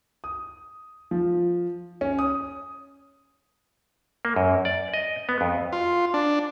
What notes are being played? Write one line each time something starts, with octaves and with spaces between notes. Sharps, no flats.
D#6
F3
C#4
D#6
A#3
F#2
D5
D#5
B3
F2
F4
D4